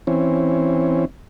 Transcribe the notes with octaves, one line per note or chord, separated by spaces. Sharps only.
E3 C4 C#4